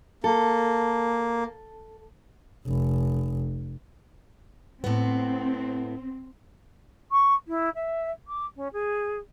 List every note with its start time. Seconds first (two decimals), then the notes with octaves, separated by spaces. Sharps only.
0.24 A#3 A4
2.67 F1
4.84 A2 B3 C4
7.11 C#6
7.47 E4
7.74 E5
8.27 D6
8.55 C#4
8.73 G#4